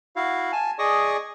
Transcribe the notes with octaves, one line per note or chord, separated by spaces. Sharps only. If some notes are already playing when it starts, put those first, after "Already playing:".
E4 F#4 F5
G#5 A5
G#4 D5 D#5 C#6 D#6